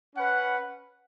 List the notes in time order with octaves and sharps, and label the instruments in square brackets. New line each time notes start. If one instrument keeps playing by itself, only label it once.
[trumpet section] C#4 B4 F#5